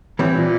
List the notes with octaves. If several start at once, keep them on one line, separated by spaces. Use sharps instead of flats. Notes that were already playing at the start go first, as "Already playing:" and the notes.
A2 E3 G3 C4
A#2